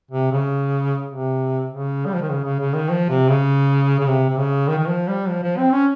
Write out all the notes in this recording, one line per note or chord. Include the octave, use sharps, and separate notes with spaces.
C3
C#3
C3
C#3
G3
F3
D#3
C#3
C#3
C#3
D#3
F3
C3
C#3
C#3
C3
C3
C#3
D#3
D#3
F3
G3
F3
F3
C4
C#4